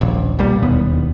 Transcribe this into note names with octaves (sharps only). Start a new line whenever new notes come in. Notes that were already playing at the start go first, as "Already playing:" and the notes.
D#1 A#1
B1 A#2 G3
E1 D#2 B3